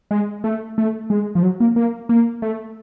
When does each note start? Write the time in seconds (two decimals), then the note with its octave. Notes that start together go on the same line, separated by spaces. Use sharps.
0.11 G#3
0.44 A3
0.78 A3
1.10 G#3
1.35 F3
1.43 F#3
1.60 A#3
1.76 A#3
2.09 A#3
2.42 A3